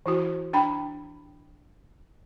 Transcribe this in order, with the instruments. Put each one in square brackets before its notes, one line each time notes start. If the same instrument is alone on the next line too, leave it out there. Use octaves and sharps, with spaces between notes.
[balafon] E3 E4 F#4
D4 G5 B5